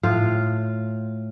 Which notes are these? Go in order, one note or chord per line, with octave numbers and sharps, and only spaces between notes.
A2 F4 F5